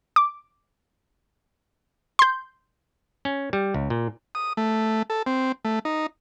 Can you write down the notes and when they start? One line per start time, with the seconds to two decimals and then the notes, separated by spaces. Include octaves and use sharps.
0.16 D6
2.19 C6 G6
3.25 C#4
3.53 G3
3.74 C#2
3.90 A#2
4.35 D#6
4.57 A3
5.10 A4
5.26 C4
5.65 A3
5.85 D#4